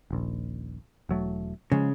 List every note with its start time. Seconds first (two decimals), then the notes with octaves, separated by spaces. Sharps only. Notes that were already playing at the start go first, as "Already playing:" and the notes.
0.10 D#1 A#1
1.09 E1 F#3 A3
1.72 C#3 F3 G#3